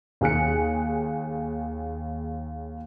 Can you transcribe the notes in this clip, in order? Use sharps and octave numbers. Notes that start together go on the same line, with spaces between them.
D#2 G#4 F#6 C#7